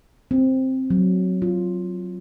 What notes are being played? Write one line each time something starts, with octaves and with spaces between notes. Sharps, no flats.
C4
F#3
F4